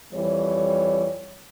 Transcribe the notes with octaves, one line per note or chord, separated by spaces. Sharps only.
F2 E3 G3 C#5